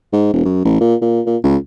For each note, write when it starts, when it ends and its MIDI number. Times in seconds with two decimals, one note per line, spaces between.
0.13 0.31 44
0.33 0.45 28
0.45 0.63 42
0.65 0.80 33
0.81 0.95 46
1.01 1.21 46
1.26 1.37 46
1.44 1.57 37